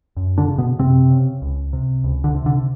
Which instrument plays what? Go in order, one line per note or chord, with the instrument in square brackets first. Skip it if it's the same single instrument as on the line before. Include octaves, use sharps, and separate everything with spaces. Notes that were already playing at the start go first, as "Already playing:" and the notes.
[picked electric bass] F#2
D3 D4
C#3
B2 B3
F#2 C3 C4
C#3
C#2
C3
C#2
D3
C3
D3